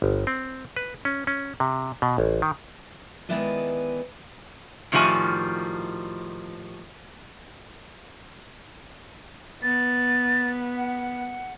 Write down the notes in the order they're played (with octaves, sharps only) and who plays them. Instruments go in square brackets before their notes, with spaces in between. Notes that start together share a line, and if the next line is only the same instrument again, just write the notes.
[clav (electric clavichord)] G1
C4
B4
C#4
C#4
C3
B2
A1
D#3
[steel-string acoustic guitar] D#3 G#3 B3 E4 B4 D5
[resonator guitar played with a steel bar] A2 D#3 F3 G3 F#4 G#5
[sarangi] B3 [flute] A6
[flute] F#5